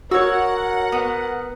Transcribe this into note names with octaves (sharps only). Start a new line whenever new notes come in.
F#4 A#4 C#5 F#5 E6
B3